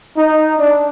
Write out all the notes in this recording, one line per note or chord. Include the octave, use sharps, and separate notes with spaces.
D#4
D4